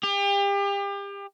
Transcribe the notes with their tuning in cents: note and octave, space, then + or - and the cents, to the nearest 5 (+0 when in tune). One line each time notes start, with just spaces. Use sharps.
G4 +35